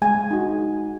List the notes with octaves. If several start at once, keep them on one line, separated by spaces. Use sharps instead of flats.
G#3 G#5
D#4 F#4